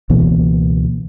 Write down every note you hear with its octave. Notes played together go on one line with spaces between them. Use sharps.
C#2 B2 E3 A#3